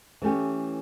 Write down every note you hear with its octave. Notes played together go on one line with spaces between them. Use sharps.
E3 A3 C#4 G4